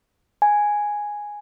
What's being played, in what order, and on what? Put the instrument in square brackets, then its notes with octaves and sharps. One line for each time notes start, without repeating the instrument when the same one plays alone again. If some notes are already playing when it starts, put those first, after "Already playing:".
[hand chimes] G#5